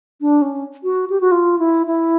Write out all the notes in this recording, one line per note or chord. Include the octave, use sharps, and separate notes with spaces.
D4
C#4
F#4
G4
F#4
F4
E4
E4